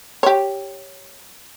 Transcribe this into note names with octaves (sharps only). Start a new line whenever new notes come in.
G4 C#5